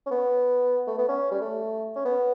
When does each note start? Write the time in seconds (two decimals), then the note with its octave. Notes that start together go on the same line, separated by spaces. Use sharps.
0.06 C#4
0.11 B3
0.87 A3
0.98 B3
1.08 C#4
1.31 G3
1.41 A3
1.96 C#4
2.05 B3